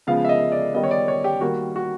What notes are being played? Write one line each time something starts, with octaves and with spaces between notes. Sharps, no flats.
C#3 F3 G#3 B3 F5
E5
D#5
D5
D#3 G3 B3 D#5
C#5
D5
C#5
G4
D#3 G3 A#3 F#4
F#4